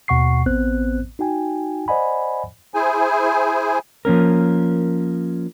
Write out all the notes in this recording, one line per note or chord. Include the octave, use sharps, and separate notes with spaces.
D#2 B2 F#5 C#6 C7
A1 B3 C4 C5 F#6
D#4 F#4 G5 G#5
C5 D5 D#5 F#5 G#5 B5
E4 G#4 C5 G#5
F3 A#3 C#4 A#4